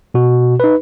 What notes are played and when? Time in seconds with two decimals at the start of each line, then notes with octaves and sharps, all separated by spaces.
0.14 B2 F#4
0.60 D#4 B4